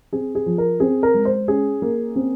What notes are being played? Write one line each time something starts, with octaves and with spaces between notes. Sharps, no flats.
C4 G#4
G#4
F3
A#4
C4 G#4
A#4
G#3
C5
C#4 G#4
A#3
C4